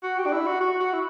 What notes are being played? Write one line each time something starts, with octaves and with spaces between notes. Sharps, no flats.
F#4
G4
D4
E4
F#4
F#4
F#4
E4